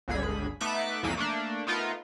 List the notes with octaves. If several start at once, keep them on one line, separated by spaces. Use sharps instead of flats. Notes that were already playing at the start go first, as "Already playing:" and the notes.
G1 C#2 D3 G#4 B5
A3 B3 D#4 E5 D6 F#6
C2 F2 E3 A#3 B6 D#7
A3 A#3 D4
A3 B3 D#4 F4 A#4